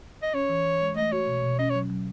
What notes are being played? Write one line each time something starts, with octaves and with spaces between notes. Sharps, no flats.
D#5
C#4 C#5
E3
E3
G#3
A3 D#5
F#4 C#5
B2
B2
C#4 D#5
C#5
F#3
F#3